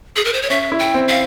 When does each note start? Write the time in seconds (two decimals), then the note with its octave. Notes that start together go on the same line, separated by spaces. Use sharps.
0.16 G#4
0.25 A#4
0.33 C5
0.42 C#5
0.50 C#4 E5
0.72 E4
0.79 G5
0.94 C4
1.08 F5